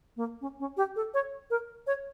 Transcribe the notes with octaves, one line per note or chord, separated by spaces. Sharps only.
A#3
C#4
C#4
G4
A4
C#5
A#4
C#5